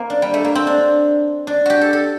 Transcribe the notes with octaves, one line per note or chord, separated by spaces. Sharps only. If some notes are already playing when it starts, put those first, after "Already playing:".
Already playing: A#3 C4
D4
G3
A3
A#3
C4
D4
D4
F#4 G4
A4
A4